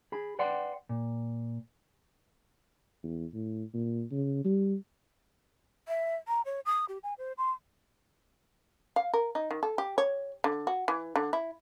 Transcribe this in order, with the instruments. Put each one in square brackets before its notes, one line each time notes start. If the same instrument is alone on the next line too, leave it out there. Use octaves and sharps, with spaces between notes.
[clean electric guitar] G#4 B5
B4 D5 F#5 G5 C6
A#2
[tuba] E2
A2
A#2
C#3
G3
[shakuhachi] E5
A#5
C#5
D#6
G4
G#5
C5
C6
[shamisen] F5
A#4
D#4
D#3
A4
G4
C#5
D3
F#4
E3
D3
E4